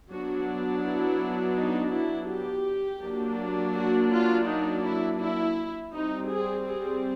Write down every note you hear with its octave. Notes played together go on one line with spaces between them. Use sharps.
F#3 B3 D4 F#4
E4
D#4
E4
G4
F#3 A#3 D4
F#4
F4
D#4
E4
E4
G3 C4 D#4
G#4
G#4